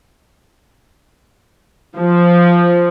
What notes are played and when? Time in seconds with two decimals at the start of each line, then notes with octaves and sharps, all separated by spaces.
1.97 F3